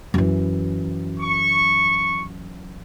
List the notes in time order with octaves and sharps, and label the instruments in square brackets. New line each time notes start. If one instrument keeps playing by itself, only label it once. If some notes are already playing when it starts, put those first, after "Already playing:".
[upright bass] F#2 E3
[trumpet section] C#6